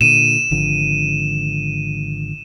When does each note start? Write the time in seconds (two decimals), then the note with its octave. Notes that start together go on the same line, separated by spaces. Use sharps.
0.01 A#2 D3 D#7 E7
0.51 G#1 D3 F3